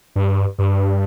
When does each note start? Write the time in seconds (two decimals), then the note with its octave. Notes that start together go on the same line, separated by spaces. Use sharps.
0.16 G2
0.59 G2